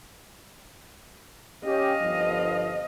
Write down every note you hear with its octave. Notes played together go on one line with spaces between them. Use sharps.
C#4 G4 D#5 F5
G1 F3